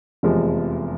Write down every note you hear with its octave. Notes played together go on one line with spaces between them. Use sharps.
F1 E2 C3 F3 G#3